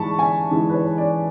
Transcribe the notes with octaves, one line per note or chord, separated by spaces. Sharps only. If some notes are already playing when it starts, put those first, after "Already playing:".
Already playing: G#2 E3 G#3 A5 B5 C#6
G#5
G#2 E3 G#3
B4
C#5
D5